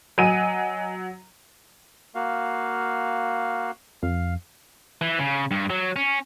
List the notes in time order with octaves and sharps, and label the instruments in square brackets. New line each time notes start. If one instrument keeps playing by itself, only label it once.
[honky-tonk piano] F#3 D#7 [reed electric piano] D#5 G#5
[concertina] A#3 F#4 F5
[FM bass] F2 [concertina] F5
[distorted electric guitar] E3
C#3
G2
F#3
C#4